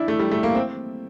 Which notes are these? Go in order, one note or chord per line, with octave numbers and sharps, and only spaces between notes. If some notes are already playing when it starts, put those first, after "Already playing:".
Already playing: D4 E4
A3
G3
A3
A#3
C4